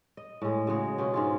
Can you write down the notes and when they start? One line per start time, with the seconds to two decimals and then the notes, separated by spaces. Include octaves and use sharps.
0.17 D#5
0.42 A2 G#3
0.67 C#3 F#3 G#3 C#5
0.98 B2 C#4 F4 G#4
1.14 G#2 G#3 F4